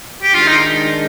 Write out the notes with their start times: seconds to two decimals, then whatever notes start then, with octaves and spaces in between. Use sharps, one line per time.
0.23 G4
0.33 D#3 G#3 D4 F4
0.47 D#4